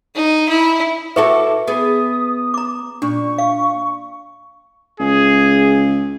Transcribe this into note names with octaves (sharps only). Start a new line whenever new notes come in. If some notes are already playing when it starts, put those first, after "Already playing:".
D#4
E4
E4 F#4 A4 B4 E5 C#6 D6
B3 G#4 D#6
A#5 D6
A#2 D4 C#6
F5
C#2 G#4